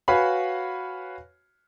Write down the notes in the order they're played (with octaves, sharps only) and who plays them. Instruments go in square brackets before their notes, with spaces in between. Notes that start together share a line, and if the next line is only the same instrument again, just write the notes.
[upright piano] F#4 B4 C#5 F5 G#5 B5